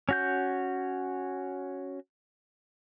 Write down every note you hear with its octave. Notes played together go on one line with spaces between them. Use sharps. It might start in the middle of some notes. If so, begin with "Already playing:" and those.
C#4 F#4 G6